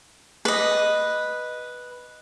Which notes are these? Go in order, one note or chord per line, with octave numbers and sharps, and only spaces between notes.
B4 D#5